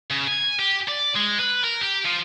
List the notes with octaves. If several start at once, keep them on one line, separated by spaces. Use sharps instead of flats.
C#3
G#5
G4
D5
G#3
B4
A#4
G4
F3